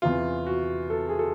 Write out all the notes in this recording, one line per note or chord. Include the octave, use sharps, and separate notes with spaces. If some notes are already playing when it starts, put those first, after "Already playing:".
E2 C3 E3 F4
F#4
A4
G#4
A4